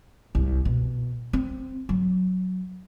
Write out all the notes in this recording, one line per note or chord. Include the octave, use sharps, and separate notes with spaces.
C2
B2
C4
F#3